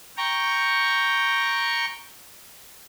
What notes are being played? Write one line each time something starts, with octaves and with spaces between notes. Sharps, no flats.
G5 A#5 C#6